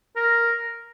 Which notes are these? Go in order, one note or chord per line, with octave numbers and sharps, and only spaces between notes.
A#4